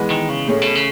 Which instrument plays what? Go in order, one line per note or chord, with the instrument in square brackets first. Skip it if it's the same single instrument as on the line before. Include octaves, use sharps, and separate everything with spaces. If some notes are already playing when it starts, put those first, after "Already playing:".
Already playing: [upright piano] E3 G#3 B3
[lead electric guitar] D#3
C#3
[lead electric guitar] A2 [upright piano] A3 C#4 G#4
[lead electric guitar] B2
C#3